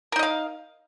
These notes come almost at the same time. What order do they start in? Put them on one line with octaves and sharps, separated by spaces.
A#4 D#4 D#5 F5